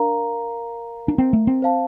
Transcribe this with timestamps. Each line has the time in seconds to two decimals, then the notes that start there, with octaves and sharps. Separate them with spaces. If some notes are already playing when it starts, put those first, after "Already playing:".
Already playing: D4 A#4 F5 A#5
1.08 D4
1.18 C4
1.33 A3
1.47 C4
1.62 C5 F5 A5